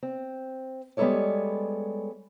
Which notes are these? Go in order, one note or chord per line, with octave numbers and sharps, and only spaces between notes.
C4
G3 G#3 B3 A4 C#5 D5